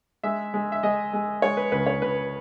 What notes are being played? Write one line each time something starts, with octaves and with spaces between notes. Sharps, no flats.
G#3 E5
G#3
E5
G#3 D#5
G#3
G#3 C#5
B4
C#2 B4
C#5
C#2 B4